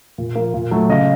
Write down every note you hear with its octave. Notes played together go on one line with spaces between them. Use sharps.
A#2
F3 A#3
A#2
F#3 A3
C#3 D#5